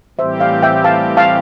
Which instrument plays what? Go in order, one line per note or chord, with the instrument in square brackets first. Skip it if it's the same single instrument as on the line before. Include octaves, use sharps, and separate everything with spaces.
[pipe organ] A2 E3 G3 C4 G4 [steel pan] C5 E5
[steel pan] D5 F5
E5 G5
F5 A5
F5 A5